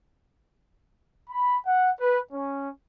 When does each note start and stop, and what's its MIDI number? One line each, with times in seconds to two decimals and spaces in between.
1.30 1.58 83
1.66 1.91 78
2.00 2.19 71
2.31 2.70 61